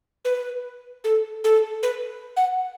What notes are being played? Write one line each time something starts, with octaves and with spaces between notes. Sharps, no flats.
B4
A4
A4
B4
F#5